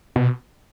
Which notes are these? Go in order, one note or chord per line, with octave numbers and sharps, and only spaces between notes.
B2